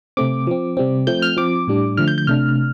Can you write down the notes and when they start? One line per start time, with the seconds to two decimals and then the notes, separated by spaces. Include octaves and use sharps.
0.17 C3 A3 C4 D6
0.47 F3 C4
0.77 C3 G3 C4
1.07 F3 A3 C4 G6
1.22 F6
1.37 F3 C4 D6
1.67 A2 G3 D4
1.97 D3 F3 A3 F6
2.08 G6
2.18 G6
2.27 C3 A3 D4 F6